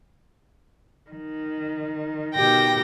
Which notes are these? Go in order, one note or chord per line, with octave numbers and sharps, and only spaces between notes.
D#3
B2 D#3 G4 G5 A#6